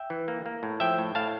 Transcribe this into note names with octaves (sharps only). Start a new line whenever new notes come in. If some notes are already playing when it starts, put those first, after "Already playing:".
Already playing: E5 G5
E3
A#3
A#3
A2
F3 E5 G5
A2
A2 F5 A5